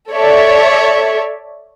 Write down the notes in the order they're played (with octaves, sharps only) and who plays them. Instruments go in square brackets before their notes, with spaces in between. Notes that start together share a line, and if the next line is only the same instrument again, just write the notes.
[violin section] A4 C#5 D5 E5